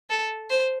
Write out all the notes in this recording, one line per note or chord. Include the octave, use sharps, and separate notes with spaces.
A4
C5